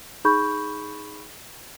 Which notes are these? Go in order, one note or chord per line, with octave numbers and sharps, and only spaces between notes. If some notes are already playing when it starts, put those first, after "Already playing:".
D#4 G#4 B5 C#6 G6